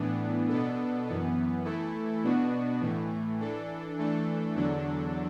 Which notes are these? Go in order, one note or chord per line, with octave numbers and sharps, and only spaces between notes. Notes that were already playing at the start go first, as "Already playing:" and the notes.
Already playing: A2 E3 B3 D4
B2 B3 D4 A4
F#2 E3 B3
E3 A3 E4 A4
B2 B3 D4 F#4
A2 E3 A3
E3 D4 A4
E3 A3 D4 A4
E2 D3 F#3 D4 A4